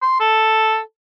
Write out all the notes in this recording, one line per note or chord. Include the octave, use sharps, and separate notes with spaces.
C6
A4